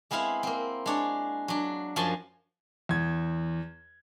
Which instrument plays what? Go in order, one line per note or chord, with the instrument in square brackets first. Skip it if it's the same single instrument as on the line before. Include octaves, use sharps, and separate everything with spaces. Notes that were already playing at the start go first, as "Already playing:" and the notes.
[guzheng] G#3 B3 C4 E4 F5
A#3 C4
G#3 D4 C#5
F#3 D4
F#2 F3 F#3 G#5 A5 C6
[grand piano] E2 G#6